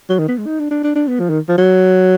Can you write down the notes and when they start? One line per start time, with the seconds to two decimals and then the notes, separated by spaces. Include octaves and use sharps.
0.10 F#3
0.19 D#3
0.28 B3
0.38 G#3
0.46 D#4
0.60 D4
0.71 D4
0.83 D4
0.95 D4
1.08 B3
1.20 F3
1.30 D#3
1.49 F3
1.58 F#3